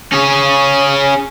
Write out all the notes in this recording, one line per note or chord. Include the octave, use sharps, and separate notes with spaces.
C#4 G#4